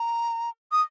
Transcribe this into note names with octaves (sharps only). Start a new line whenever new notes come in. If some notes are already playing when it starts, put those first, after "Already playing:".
Already playing: A#5
D#6